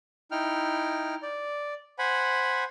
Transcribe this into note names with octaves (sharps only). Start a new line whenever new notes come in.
D#4 E4 G5 F6
D5
C5 F#5 G#5 B5